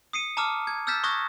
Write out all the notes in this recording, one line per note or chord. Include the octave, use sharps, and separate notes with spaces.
D#6 C7 C#7 D#7
A5 A#5 D6 D#6 F6
G#6
E6 F6 G6 A6 B6 E7
C#6 D#6 F#6 G#6 A#6